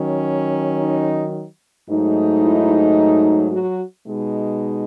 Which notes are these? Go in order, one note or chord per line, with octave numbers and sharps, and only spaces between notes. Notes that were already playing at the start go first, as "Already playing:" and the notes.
Already playing: D#3 F#3 C#4
D#4
G#2 F#3 A3 D#4
E4
F#3 F#4
B2 G#3 D#4